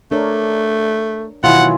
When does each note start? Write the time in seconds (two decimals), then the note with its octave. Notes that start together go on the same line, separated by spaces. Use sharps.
0.11 A3 D4 A#4 C#5
1.44 B2 D#3 E3 F#3 F4 F#5